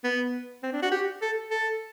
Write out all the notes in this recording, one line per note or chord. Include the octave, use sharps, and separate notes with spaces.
B3
C4
D4
F#4
G4
A4
A4